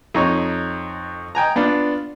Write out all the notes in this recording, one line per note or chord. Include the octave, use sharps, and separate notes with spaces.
F2 D#4 C#5
D#5 G5 G#5 A#5
B3 D4 F4 F5